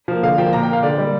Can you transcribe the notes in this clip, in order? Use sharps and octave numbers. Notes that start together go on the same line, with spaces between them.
F3 A#3
D3 F5
F3 A#3 G5
A#2 A#5
G5
A#3 F5
D3 D5
G3 A#3